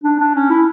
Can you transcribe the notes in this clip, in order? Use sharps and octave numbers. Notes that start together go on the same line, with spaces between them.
D4
D4
C#4
E4